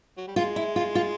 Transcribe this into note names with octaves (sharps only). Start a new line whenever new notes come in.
F#3
G3
G#3 F4
E4
F4
F4